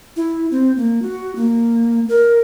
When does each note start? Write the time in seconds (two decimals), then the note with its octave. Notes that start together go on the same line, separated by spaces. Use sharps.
0.16 E4
0.51 C4
0.77 A#3
1.02 F#4
1.36 A#3
2.09 A#4